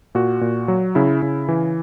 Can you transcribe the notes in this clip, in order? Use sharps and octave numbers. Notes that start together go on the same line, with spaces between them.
A#2 F#4
A#2
F#3
C#3 E4
C#3
E3